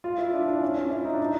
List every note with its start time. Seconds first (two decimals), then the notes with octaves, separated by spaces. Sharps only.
0.04 F4
0.18 E4
0.33 D4
0.47 D4
0.62 C#4
0.77 F4
0.91 E4
1.05 D#4
1.13 D4
1.20 D#4